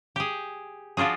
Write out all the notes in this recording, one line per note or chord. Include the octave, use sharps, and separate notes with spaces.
G4 G#4
F3 D4 F4 F#4 G#4